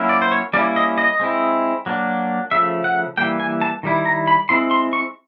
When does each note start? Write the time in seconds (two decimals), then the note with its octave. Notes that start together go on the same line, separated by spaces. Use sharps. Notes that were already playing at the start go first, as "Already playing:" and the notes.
Already playing: F#3 A#3 C#4 E4
0.09 D5
0.22 C5
0.32 C#5
0.53 G3 A#3 C#4 E4 D5
0.76 D#5
0.98 D#5
1.20 G#3 C4 E4
1.86 F#3 A#3 D4
2.51 C#3 F3 A3 E5
2.84 F#5
3.17 E3 G3 A#3 G5
3.40 G#5
3.61 A5
3.83 D#3 G3 E4
4.06 A#5
4.27 B5
4.49 G#3 C4 E4 C6
4.71 C6
4.93 C#6